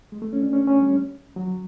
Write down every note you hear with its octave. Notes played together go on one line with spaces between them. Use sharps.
G#3
A3
C#4
D4
C#4
C#4
G3
F#3